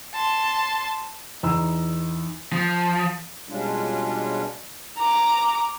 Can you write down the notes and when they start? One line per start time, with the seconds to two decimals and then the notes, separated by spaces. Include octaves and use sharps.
0.14 A5 C6
1.43 E2 D#4 A#5 E6
2.53 F3
3.49 B2 G3 G#3 C#4 D4 F4
4.98 A#5 D6